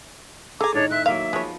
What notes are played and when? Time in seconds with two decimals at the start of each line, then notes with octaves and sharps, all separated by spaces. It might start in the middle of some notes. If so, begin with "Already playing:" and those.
0.61 G#4 A4 G#5 A#5 D6
0.74 A2 D#3 D4 D#4 C#5
0.91 C4 E5 F#6
1.06 F#3 A#3 C4 E5 F5
1.33 F3 G#3 B3 C#5